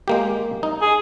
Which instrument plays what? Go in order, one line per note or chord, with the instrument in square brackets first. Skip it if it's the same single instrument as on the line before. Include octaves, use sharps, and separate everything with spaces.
[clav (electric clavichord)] G#3 A#3 G4
D#4
[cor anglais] G#4